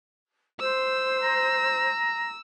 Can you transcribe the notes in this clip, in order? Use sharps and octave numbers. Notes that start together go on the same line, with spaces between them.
C5 E6
A#5